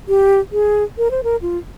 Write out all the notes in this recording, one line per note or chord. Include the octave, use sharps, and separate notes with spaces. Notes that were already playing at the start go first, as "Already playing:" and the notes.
G4
G#4
A#4
C5
A#4
F4